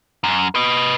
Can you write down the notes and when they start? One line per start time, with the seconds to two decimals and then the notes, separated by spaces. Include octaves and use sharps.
0.24 F#2
0.55 B4 D#5